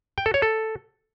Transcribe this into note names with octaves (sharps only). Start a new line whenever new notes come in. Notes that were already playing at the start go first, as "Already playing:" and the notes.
G5
A4
C#5
A4